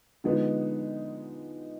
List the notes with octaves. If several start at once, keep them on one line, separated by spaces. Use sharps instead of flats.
D3 F3 G#3 B3 D#4